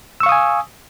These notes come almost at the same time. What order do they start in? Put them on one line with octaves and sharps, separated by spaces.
E6 C#6 F5 D#6 G#5